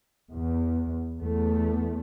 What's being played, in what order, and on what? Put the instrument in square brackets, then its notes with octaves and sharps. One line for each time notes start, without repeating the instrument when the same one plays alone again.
[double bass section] E2
E2 A3